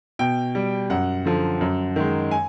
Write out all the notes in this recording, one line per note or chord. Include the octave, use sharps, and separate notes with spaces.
B2 G5
G3
F#2 F#5
D3 F3
F#2
D#3 G#3
G#5